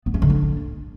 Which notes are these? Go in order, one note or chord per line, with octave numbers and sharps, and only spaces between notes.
B3
C#4
D3
D4